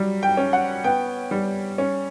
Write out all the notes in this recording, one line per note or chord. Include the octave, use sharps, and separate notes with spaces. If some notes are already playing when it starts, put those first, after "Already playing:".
Already playing: F#3 G3
G5
C#4
F#5
B3 G5
G3
C#4